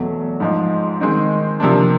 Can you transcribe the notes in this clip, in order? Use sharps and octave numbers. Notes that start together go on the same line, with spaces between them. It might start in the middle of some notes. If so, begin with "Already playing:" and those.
Already playing: E2 B2 F#3 A3
G#2 F3 G#3
D#3 G#3 C4 D#4
C3 F3 A#3 D4